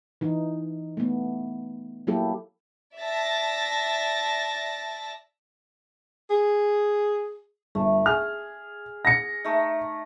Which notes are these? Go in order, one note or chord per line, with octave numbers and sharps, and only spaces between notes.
E3 D#4
A3 B3
F#3 A#3 E4 G4 A4
D5 E5 A5 A6 A#6
G#4
G1 A3
G#4 F6
A#6 C#7
A3 D#4